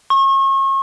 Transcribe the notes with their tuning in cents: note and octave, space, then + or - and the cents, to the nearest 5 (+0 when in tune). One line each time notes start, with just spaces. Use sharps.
C#6 -35